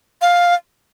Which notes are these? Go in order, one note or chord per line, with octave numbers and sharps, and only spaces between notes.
F5